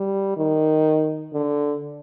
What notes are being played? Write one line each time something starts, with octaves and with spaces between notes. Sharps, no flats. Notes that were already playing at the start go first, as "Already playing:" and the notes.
Already playing: G3
D#3
D3